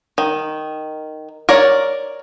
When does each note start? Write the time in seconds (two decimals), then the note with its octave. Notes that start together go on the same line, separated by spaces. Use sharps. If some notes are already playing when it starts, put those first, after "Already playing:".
0.18 D#3
1.49 A#4 C#5 D5